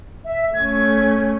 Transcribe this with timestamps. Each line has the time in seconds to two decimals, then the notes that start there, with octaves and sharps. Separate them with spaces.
0.25 E5
0.54 A3 C#4 G#6